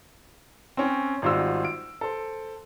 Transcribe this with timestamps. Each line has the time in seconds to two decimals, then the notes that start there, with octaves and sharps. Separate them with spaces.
0.77 C4 C#4 G5
1.22 G#1 G3 F4 F#4 C5 E6
1.64 D7
2.01 A4 C5